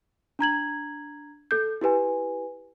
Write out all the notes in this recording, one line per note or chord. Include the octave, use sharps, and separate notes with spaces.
D4 A#5 G#6 F#7
A4 G6
E4 G4 B4 G#5